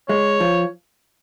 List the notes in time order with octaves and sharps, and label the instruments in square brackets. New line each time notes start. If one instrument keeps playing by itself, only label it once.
[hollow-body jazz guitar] G#3 [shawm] C#5
[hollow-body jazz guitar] F3